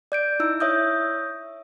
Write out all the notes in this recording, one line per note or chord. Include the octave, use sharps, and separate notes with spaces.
D5 G6 D7
D#4 E4 E6
C#5 E5 D#6 G6